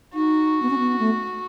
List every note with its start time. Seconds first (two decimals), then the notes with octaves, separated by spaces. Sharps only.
0.14 D#4 F#4
0.63 B3
0.70 C#4
0.79 B3
0.99 A3